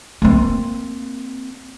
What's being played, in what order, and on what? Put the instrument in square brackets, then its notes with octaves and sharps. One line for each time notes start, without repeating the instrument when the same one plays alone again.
[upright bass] A#3 C4